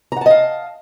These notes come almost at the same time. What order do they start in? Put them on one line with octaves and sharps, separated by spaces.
A#5 F#5 A5 D#5 F5